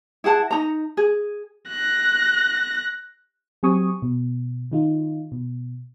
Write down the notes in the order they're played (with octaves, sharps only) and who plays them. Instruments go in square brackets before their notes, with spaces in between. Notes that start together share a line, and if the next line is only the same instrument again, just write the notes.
[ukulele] E4 G#4 F#5 A5
D#4 A#5
G#4
[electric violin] F#6 A#6
[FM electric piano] F#3 C4 G4 G#5 C#6 D#6
B2
D#3 D#4 F4
B2